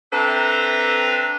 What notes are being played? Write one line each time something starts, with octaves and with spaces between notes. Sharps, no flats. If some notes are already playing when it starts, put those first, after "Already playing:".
C4 D4 A4 B4 E5 A#5